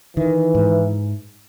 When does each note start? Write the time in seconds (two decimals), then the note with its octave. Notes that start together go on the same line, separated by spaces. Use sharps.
0.17 D#3 E3
0.55 G#2